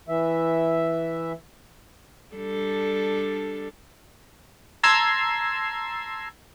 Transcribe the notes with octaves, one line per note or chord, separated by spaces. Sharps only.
E3 E5
G3 D4 A4
A5 A#5 C6 E6 G#6 C7